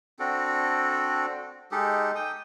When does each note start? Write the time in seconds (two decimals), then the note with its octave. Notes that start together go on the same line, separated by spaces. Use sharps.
0.19 C4 D4 F#4 A4
1.72 G#3 D#4 G4 A4
2.15 G5 D#6